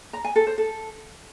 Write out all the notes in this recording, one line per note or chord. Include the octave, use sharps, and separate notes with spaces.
A#5
G#5
A4
C5
A4